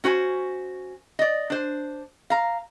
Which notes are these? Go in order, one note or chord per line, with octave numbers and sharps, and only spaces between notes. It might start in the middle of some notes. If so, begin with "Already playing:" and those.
C#4 F#4 C5 G#5
D5 D#5
D4 C5
F5 A#5